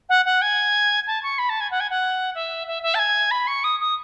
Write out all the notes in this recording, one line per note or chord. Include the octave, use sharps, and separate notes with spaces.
F#5
F#5
G#5
A5
C#6
B5
A5
G#5
F#5
G#5
F#5
E5
E5
E5
A5
G#5
B5
C#6
D#6
D#6